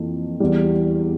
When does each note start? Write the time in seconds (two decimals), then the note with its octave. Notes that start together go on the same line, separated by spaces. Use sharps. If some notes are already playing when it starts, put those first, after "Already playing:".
Already playing: F2 E3 A#3
0.40 E2 E3 G3